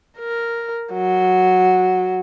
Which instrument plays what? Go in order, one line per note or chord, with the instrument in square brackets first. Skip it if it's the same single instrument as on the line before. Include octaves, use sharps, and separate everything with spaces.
[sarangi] A#4
F#3